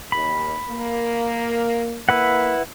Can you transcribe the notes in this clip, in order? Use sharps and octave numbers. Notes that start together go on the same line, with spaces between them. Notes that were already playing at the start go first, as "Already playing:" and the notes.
D#2 B5
A#3
A#3 E4 B4 F#5